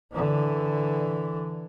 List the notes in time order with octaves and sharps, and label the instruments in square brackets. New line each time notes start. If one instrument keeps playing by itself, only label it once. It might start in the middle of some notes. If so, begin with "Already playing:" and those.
[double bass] D3 E3